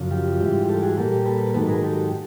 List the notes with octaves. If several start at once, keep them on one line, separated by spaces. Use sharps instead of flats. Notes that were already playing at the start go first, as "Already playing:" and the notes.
Already playing: F#2 C#3 F3
F4 G4
G#2 E3 G3
G4 A4
F#4 G#4
A#2 G3 A#3 G4 A4
A4 B4
G#2 D#3 F#3 A4 B4
G#4 A#4
G4 A4